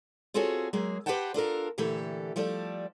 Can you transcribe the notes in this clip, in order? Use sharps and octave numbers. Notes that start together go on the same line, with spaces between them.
C4 F4 F#4 G#4 A4 C#5
F#3 G#3 A#3 G#4
G4 B4 C5 F#5 G5 A5
D4 F4 A4 A#4
A#2 D3 E3 A3 G4 A4
F3 G3 A3 A4 D5